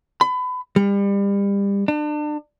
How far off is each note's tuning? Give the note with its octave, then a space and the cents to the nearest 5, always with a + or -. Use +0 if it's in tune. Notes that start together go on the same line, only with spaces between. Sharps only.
B5 +30
G3 +30
D4 +35